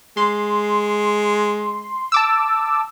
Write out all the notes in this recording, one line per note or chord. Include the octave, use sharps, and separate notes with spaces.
G#3 C6
A5 D6 E6